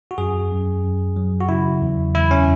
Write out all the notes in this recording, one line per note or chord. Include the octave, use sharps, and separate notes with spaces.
F#4
F#2 G#4
F#2
F#2
F#3
F#4
C#3 E4
E2
E2 E4
C#4